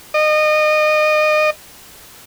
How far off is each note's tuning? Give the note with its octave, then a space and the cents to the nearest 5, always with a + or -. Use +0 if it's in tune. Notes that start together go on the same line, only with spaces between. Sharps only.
D#5 -25